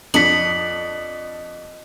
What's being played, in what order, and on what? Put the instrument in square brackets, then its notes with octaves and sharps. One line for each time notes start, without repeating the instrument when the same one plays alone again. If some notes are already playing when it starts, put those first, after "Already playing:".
[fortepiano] F2 D4 [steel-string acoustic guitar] D#5 [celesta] B6 C#7 F#7